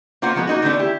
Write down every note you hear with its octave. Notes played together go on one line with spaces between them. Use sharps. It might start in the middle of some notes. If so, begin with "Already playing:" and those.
A#3 B3 F4 C5 F#5
F3 F#3 G#3 B3 A#4
A#3 D#4 F#4
D3 D#3 A3 B3 D4
E4 G4